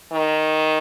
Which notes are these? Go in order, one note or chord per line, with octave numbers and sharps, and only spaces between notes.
D#3